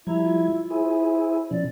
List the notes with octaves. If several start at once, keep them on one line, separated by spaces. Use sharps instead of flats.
F3 G3 E4 A#5 G#6
F4
E4 G#4 C5 G#5
B2 F3 C#4 D5